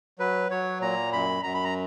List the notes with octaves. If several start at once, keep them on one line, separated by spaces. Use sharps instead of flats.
F#3 B4
F#3 C#5
A#2 A#5
F#2 B5
F#2 A#5
B5
A#5